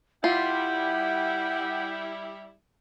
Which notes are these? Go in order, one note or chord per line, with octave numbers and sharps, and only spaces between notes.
G3 E4 F4 F#5 G5